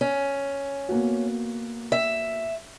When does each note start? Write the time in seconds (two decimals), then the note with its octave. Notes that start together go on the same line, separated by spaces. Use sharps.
0.01 C#4
0.89 A#3 B3 F#4
1.92 E5